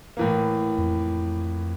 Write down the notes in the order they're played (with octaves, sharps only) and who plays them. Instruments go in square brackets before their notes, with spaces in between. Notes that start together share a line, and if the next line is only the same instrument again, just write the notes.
[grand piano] A2 E3 A#3
[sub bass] F2